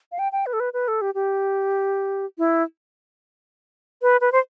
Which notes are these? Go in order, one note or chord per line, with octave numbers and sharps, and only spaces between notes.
F5
G5
G5
B4
A4
B4
B4
A4
G4
G4
E4
B4
B4
C5